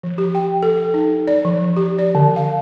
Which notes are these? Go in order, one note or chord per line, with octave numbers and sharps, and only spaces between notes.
F3
G4
G5
A4
A4
D#4
D5
F3
G4
D5
D3
F5